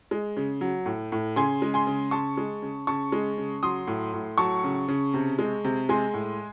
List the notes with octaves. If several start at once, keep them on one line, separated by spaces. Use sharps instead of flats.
G#3
C#3
F#3
A2
A2
C#3 G#5 C6
G#3
G#5 C6
C#3
C#3 A5 C#6
G#3
C#3
C#3 A5 C#6
G#3
C#3
F#3 C6 D#6
A2
A2
F#3 A5 C#6
C#3
C#3
C3
G#3
C3
G#3 G#5 C6
A2